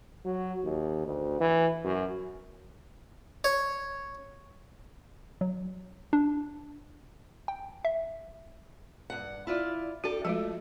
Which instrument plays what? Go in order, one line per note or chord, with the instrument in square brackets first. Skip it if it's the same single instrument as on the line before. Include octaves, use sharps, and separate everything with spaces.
[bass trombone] F#3
D#2
D2
E3
F#2
[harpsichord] C#5
[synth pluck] F#3
D4
G5
E5
[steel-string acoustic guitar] G2 F#5
E4 F4 D5
[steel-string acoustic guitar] D4 G4 A4 [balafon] F#4
[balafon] F3 G#3 F4 [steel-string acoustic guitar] A3